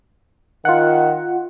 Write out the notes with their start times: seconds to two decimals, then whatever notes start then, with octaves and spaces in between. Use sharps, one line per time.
0.65 D#3 F4 F#5